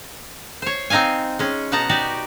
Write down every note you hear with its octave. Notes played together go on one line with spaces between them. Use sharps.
C5 C#5
C4 D#4 D#5 F5 G#5
G#3 C#4
B2 B3 D#4 F#5 A5 A#5
D#4 F#4 G4 D5